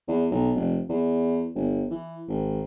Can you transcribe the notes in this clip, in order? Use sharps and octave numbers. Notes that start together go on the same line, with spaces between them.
E2
B1
F1
E2
G1
E3
G#1